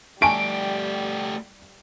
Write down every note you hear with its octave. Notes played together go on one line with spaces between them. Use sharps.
G3 A3 G4 G#5 A5 C#6 D7